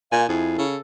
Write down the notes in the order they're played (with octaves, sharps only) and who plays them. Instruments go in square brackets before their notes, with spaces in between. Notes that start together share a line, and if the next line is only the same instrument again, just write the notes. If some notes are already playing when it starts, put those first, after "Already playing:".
[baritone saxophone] A#2 [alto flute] F5 [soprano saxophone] G#5
[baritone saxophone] F2 [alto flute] E4 [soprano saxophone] G#4
[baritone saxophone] C#3 [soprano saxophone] A4